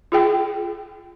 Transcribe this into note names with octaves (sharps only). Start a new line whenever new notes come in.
F4 G#4 G5